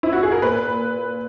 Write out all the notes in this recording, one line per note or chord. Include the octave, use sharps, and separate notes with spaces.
E4
F#4
G#4
A#4
A#2 B4